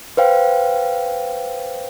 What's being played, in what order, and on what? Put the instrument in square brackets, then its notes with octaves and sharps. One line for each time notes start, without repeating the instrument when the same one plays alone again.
[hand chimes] B4 C5 F5 G5